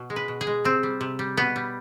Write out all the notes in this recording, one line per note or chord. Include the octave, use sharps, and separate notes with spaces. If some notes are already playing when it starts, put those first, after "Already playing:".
Already playing: B2
G#3
B4
B2
G#4
G#3
C3 C4
G3
C3
G3
B2 B3
G3